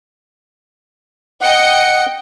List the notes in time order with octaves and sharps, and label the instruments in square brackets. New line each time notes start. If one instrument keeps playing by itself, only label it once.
[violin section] D#5 G5 C#7 [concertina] F#5